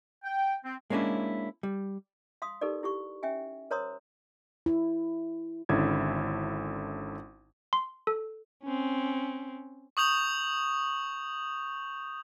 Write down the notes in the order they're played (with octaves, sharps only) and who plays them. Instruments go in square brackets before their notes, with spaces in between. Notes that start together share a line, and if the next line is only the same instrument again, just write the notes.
[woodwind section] G5
C4
[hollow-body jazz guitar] G#3 A#3 C#4 D4 E4
G3
[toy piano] F5 C6 D#6
D#4 G4 A4 A#4 D5
E4 G4 C#6
C#4 E5 G5 G#5
A#4 C5 C#5 A#5 C6 D#6
[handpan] E4
[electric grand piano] G#1 D3 C#4 E4 G#6
[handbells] C6
A4
[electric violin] C4 C#4
[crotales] C#6 D#6 G6 F7